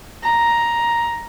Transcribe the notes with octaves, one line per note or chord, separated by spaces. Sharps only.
A#5